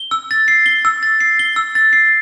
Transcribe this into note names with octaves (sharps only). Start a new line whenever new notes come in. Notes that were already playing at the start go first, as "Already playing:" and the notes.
Already playing: G7
E6
A6
C7
G7
E6
A6
C7
G7
E6
A6
C7